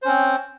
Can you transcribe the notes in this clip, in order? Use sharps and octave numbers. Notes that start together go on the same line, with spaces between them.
C4 C#4 C5